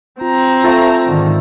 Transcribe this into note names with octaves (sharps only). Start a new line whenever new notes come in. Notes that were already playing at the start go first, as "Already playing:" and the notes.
C4 F4 A#5
A3 F4 A4 C5
G#2 D3 D#3